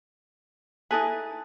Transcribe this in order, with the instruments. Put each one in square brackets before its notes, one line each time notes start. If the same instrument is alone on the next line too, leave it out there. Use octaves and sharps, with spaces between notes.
[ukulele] D#4 A4 B4 [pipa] E4 G#4